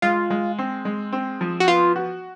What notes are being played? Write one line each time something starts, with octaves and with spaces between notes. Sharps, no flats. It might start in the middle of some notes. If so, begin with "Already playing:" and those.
G#3 F4
G#3
C4
G#3
C4
F3
F#4
B3 F4
F#4